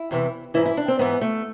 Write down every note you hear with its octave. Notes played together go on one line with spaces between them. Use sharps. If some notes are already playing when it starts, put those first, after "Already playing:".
Already playing: E4
E2 C3 E3
G#2 E3 E4
E4
D4
C4
G#2 E3 B3
A3